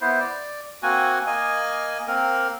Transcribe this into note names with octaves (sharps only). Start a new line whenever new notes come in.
B3 E4 C5
D5
A#3 C4 F#4 G#5
A#3 D#5 G#5
A#3 C4 A#4